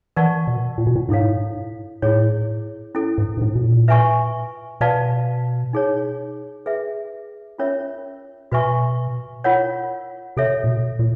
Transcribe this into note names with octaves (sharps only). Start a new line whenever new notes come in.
E3 A#4 D5 F#5 A5 C#6
B2
A#2
B2
A#2
G#2 E4 A4 C#5 F5
A2 E4 G#4 C#5
C#4 E4 A4
G#2
G#2
A2
B2
A#2
B4 E5 G#5 C#6
B2 B4 D5 F5 A5
D#4 G#4 C#5
G#4 B4 E5
C#4 F4 A#4 C#5 E5
B2 F#4 B4 E5 G#5 C#6
F4 A#4 C#5 F#5
C3 A4 C#5 E5
A#2
B2
A#2